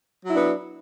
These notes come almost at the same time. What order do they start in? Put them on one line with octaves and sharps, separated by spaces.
F#3 E4 D4 B3